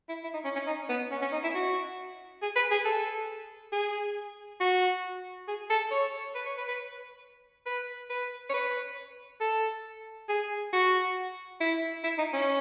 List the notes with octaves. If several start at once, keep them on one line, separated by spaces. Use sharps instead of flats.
E4
E4
D#4
C#4
C#4
D#4
B3
C#4
C#4
D#4
E4
F#4
G#4
B4
G#4
A4
G#4
F#4
G#4
A4
C#5
B4
C#5
B4
B4
B4
B4
C#5
B4
A4
G#4
F#4
E4
E4
D#4
C#4